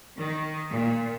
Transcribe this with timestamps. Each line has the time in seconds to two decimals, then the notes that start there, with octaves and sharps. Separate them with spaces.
0.18 D#3
0.71 A#2